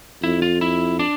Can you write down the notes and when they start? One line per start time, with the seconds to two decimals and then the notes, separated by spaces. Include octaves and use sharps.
0.23 F2 E4
0.42 F4
0.61 E4
0.99 D4